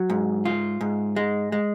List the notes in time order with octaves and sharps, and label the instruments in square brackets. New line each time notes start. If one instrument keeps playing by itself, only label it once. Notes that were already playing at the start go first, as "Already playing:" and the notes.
Already playing: [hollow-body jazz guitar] F#3
G#2
F4
G#2
G#3
G#3